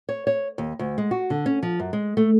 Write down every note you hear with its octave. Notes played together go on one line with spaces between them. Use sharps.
C#5
C#5
D#2
D2
G#3
F#4
D3
C#4
F3
F#2
G#3
A3